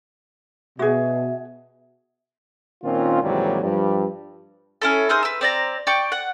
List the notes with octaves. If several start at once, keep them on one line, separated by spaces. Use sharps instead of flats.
B2 F#4 G#4 E5
A#2 D#3 C4 C#4 F4
D#2 G#2 C3 E3 F#3 G3
G2 F3 G3
C#4 E4 A4
D#4 G#4 A#4 C5
B4 E6
C4 D5 A#5
D5 G5 C#6 D6
F#5